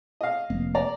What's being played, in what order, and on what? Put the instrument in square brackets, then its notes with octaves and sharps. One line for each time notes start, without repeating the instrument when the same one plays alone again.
[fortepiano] D#5 F5
[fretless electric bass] F1 A#3
[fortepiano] D5 A#5